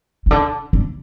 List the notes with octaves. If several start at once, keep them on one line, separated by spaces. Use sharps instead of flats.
C#3
D3
D3